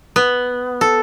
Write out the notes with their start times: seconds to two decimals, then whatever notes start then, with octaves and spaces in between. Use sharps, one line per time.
0.16 B3
0.81 A4